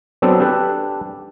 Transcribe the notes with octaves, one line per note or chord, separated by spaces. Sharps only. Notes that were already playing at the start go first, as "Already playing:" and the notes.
F#3 B3 C4 D4 A4
D4 G4 A4 B4